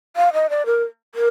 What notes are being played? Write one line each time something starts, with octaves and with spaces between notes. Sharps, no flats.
F5
D#5
D5
A#4
A#4